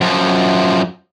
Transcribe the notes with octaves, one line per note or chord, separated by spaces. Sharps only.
F#2 F3